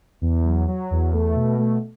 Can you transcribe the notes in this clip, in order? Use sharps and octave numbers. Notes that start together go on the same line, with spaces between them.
E2
F#3
F#3
E2
A3
B2
A3